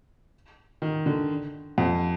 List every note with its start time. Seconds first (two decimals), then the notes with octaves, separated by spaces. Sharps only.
0.82 D#3
1.06 D3
1.78 F2